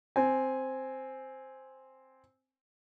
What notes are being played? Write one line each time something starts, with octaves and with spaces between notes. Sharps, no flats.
C4 G#5